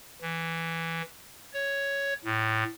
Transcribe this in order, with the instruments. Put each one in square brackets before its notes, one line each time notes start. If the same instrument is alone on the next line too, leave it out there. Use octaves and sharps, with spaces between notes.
[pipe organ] E3
C#5
A2